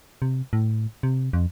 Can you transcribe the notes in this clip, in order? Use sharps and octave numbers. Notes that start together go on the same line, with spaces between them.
C3
A2
C3
F2